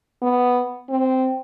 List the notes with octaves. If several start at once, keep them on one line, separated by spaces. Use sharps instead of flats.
B3
C4